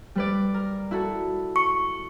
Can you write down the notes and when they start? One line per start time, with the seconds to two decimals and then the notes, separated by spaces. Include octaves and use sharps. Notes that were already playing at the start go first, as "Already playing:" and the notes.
0.15 G3 B4 D5
0.54 A#4
0.91 E4 F#4 A4
1.56 C#6